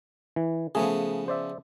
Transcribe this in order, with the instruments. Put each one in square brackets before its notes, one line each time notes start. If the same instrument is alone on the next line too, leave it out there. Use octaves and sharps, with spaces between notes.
[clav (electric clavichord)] E3
[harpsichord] C#3 F3 B3 [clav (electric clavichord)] A3 G#4
[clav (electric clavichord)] C5 D5 E5